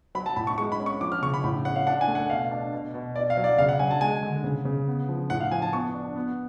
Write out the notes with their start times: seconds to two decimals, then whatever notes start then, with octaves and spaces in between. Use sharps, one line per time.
0.15 F#3 B5
0.26 A5
0.36 A2 B5
0.47 C#6
0.58 G#3 C#6
0.72 B5
0.80 C#4
0.86 C#6
1.01 F3 D6
1.12 F6
1.22 C#3 C#6
1.34 B5
1.44 A2 B5
1.65 C#4 F#5
1.76 F5
1.87 D4 F#5
2.01 G#5
2.08 A3
2.15 F#5
2.29 B2 F5
2.52 D4
2.73 B2
2.94 B2
3.16 B2 D5
3.30 F5
3.37 F#3
3.44 D5
3.58 C#3 F5
3.69 F#5
3.79 F#3 G#5
3.91 A5
4.01 G#3 G#5
4.23 D3
4.44 C#3
4.65 C#3
4.88 B3
5.09 F3
5.30 A2 F#5
5.40 F5
5.51 F3 G#5
5.62 A5
5.73 B3 C#6
5.94 D4
6.16 B3